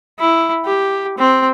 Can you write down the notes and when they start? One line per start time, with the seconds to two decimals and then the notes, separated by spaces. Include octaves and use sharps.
0.19 E4
0.65 G4
1.18 C4